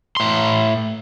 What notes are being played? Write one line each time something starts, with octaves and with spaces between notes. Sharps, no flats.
A2 C6